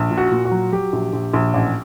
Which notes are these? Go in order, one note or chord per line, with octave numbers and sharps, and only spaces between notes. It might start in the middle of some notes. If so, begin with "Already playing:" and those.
Already playing: A#1
A#2
F#4
A#2
F#4
F#3
F#3 G4
A#1
A#1
A#1
A1